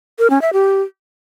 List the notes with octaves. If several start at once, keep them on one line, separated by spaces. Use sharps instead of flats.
A#4
C#4
E5
G4